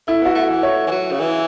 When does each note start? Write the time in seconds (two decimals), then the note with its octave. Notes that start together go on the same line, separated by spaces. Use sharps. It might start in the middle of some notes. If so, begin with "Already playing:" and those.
0.07 A3 E4
0.22 B3 F#4
0.35 A3
0.49 E3
0.63 A3 C#5
0.87 E3
0.91 F#3
1.12 C#3
1.20 E3